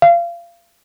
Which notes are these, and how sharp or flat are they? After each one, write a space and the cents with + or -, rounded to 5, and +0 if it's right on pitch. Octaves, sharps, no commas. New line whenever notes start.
F5 -25